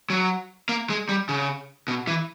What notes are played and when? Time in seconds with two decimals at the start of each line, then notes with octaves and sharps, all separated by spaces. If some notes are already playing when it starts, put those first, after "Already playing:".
0.10 F#3
0.69 A#3
0.90 G#3
1.09 G3
1.29 C#3
1.88 B2
2.07 E3